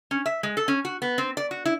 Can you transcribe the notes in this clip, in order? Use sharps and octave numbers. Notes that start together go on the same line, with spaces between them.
C#4
E5
G#3
A4
C#4
F#4
B3
C4
D5
F#4
E4